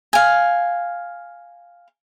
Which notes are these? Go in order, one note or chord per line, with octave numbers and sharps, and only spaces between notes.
F5 G#5